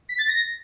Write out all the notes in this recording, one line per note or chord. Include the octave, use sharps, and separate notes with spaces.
B6
A6
A#6